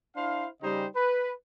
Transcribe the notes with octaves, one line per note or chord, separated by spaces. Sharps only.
D4 E4 C5 F5
C#3 G3 D#4 G4 C5 D#5
B4